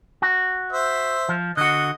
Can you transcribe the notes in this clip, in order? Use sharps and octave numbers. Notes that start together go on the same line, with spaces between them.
F#4
C5 E5
F3
D3 F#4 D#5